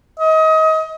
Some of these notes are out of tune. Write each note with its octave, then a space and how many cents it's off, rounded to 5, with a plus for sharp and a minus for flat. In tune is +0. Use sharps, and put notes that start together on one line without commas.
D#5 +30